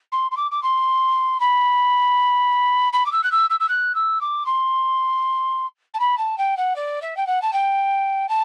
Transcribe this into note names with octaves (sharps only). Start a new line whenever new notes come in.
C6
C6
D6
D6
C6
B5
B5
D6
E6
F#6
E6
E6
E6
F#6
E6
D6
C6
A5
B5
A5
G5
F#5
D5
E5
G5
F#5
A5
G5
A5